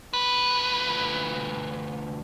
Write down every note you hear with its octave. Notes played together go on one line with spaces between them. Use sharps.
D2 B4